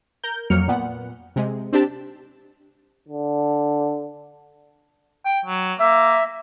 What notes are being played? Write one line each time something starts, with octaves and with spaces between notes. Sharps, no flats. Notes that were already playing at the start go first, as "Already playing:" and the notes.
A#4 G6
F2 F#3 A#3 F6 C#7
A#2 B3 F#5
C3 G#3
C4 D4 G4 A5
D3
G5
F#3
A#3 E5